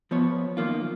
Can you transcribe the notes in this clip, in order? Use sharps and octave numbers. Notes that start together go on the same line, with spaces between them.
F3 B3 C#5
F#2 D#3 A#3 F4